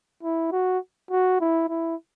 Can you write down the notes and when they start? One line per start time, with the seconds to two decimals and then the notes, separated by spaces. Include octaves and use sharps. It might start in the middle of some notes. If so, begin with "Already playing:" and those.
0.23 E4
0.52 F#4
1.11 F#4
1.40 E4
1.69 E4